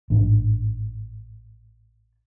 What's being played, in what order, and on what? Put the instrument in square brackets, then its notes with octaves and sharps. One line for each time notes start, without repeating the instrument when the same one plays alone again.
[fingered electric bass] A1 G#2 D4